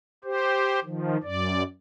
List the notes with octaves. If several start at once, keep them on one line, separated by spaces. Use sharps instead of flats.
G4 C5
D#3 F3
F#2 D5